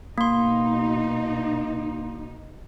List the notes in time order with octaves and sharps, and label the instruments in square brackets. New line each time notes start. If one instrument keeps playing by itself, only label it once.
[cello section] B2 D#4 [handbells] A#3 C6